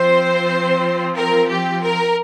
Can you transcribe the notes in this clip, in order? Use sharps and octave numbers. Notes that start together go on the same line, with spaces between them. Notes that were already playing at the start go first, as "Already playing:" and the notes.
Already playing: F3 C4 F4 C5
A#4
G4
A#4